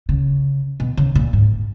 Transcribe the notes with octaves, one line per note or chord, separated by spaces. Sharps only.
C#3
B2
C#3
A#2
G#2